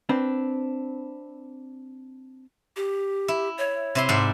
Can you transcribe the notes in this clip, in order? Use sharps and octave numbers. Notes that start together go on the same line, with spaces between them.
C4 D4 B4
G4
E4
C#5
C3 E4 C6
G#2 D5